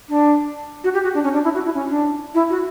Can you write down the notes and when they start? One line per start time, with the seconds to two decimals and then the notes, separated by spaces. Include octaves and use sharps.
0.09 D4
0.83 F#4
0.93 G4
1.03 F#4
1.14 D4
1.23 C#4
1.33 D4
1.44 E4
1.54 F#4
1.64 E4
1.74 C#4
1.89 D4
2.34 E4
2.50 F#4